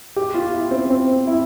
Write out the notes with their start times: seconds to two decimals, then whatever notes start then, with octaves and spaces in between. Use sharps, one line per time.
0.16 G4
0.34 F4
0.53 E4
0.71 C4
0.90 C4
1.27 E4